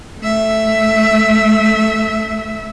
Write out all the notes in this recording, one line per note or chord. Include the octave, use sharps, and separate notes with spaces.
A3 E5